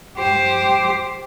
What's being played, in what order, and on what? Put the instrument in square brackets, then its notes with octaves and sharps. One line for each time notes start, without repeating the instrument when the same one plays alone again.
[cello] G4 C5